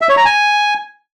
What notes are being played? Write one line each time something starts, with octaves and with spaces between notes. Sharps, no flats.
E5
C#5
A#5
G#5